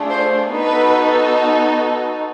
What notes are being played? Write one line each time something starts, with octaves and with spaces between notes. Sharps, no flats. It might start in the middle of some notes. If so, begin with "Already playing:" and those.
Already playing: A3 D4 F4 G#4
C5
B3 D#4 F#4 A4 B4